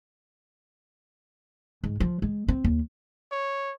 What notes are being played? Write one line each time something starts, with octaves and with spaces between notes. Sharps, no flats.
G#2
F3
G#3
C4
D#2
C#5